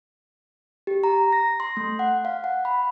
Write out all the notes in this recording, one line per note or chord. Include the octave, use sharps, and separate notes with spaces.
G4
A#5
A#6
C6
A3
F#5
F5
F#5
B5